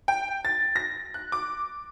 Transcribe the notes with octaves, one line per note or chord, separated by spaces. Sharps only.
G5
A6
A#6
F#6
D6